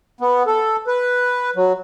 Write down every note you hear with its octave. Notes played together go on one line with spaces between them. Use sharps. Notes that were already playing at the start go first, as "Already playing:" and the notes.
B3
A4
B4
F#3